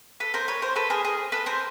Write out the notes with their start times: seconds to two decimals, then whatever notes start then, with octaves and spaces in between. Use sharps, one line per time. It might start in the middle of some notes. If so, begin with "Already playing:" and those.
0.20 A4 B4
0.34 A#4 C5
0.48 B4 C#5
0.62 A#4 C5
0.76 A4 B4
0.90 G#4 A#4
1.05 G#4 A#4
1.32 A4 B4
1.46 A#4 C5